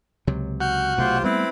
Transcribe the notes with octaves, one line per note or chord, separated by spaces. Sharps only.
C#2 C3 F#3
F#4 F6 G6
B1 C3 A3 F4 G4 C5
G3 A3 B3 C4 E4 B4